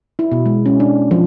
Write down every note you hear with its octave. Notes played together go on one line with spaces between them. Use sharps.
E4
B2
G#3
C#4
D4
F3